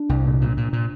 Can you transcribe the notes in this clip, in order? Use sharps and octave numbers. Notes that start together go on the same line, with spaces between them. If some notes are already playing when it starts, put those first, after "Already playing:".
Already playing: D4
C2
A#2
A#2
A#2
A#2